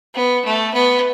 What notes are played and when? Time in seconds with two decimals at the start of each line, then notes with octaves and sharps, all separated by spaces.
0.15 B3
0.45 A3
0.74 B3